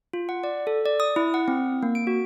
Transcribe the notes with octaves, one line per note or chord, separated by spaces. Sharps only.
F4
F#5
D5
A4
D5
D#6
E4
F#5
C4
A#3
D7
F#4